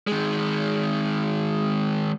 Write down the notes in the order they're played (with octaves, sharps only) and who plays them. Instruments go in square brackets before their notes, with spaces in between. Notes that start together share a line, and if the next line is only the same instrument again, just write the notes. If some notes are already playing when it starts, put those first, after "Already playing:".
[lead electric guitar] D#3 G#3